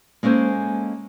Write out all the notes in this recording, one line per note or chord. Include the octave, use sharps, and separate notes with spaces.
G#3 A#3 C#4 A4 C5